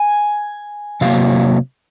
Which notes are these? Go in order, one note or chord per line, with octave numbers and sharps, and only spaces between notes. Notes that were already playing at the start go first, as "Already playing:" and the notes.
Already playing: G#5
C3 F#3 A#3 F5